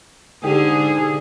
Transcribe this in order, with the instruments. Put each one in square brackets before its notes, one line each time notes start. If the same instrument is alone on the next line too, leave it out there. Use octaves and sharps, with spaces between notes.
[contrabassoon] G#2 [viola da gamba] D3 [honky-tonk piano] G4 [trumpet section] G#4